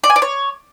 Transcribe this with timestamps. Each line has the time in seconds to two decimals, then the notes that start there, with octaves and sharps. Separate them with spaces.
0.04 D5
0.10 G#5
0.16 D5
0.22 C#5